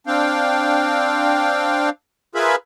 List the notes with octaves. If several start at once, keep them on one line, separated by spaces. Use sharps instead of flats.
C4 D4 F5 G5
F4 G#4 A#4 B4 E5 B5